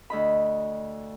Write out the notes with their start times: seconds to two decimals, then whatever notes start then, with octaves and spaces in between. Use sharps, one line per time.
0.10 D2 D#5 B5